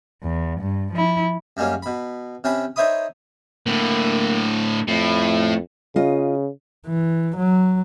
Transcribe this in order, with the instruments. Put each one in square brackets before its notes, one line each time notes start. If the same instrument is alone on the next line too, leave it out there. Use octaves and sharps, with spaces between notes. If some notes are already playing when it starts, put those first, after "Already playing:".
[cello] E2
G2
F3 E4
[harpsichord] F#2 G3 G#3 A#3 C#4
B2 B5
C3 C#4 G5 A5 B5
D#4 C5 C#5 E5 B5 D#6
[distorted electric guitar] A2 D3 [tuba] A#3
[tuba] F2 [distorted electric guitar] A2
[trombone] C#3 [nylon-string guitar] F4 D#5
[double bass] E3
F#3